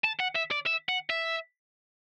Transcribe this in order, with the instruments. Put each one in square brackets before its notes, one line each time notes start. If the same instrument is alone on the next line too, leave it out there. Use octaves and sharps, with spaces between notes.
[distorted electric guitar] A5
F#5
E5
D5
E5
F#5
E5